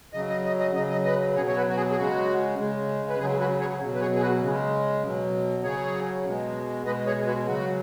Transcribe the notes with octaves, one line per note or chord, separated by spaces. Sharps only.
C#3 F#3 D#5
D#5
D#5
D#5
C#3 F#3 D#5
D#5
B4 D#5
B2 F#3 G#4 C#5
C#5
F#4 B4
F#4
G#4
G#4
C#3 G#3 F#4
C#3 G#3
B4
C#3 F#3 G#4
F#4 B4
G#4 C#5
B2 F#3
B4
G#4 C#5
G#4
F#4 B4
C#3 G#3
B2 F#3
C#3 F#3 G#4 C#5
B2 G#3
B2 G#3 B4 D#5
G#4 C#5
F#4 B4
C#3 F#3 F#4